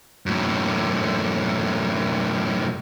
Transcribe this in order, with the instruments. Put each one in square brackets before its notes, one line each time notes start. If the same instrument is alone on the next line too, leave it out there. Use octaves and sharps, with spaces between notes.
[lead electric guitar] F#2 A2